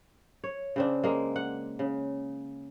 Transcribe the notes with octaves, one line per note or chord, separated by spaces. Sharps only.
C#5
C#3 C4 D4
G#3 A#3
F#5
C#3